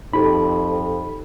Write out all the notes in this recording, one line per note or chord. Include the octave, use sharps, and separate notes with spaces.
F2 D#4 G4 A4 B5